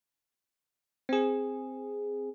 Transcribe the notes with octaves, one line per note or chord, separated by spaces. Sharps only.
C4 G#4